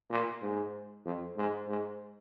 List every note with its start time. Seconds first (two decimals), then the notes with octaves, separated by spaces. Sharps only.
0.10 A#2
0.42 G#2
1.05 F2
1.37 G#2
1.68 G#2